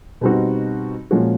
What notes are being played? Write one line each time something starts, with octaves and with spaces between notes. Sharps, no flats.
B2 G3 C4 D#4 F#4
A#2 F3 G#3 C#4 F#4